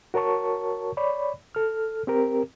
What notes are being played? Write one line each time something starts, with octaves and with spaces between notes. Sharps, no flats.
F#4 A#4 C#5 A5 C#6
C#5 D5 B5
A4 F6
C4 G4 A#4